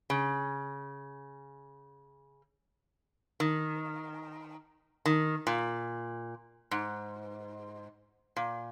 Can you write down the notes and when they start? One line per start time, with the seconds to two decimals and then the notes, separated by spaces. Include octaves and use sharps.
0.10 C#3
3.40 D#3
5.06 D#3
5.47 A#2
6.71 G#2
8.36 A#2